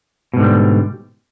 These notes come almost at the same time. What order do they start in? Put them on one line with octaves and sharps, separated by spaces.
B2 G#2 D3 G3